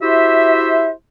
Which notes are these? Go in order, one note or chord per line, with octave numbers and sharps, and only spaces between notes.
E4 F#4 G4 C5 E5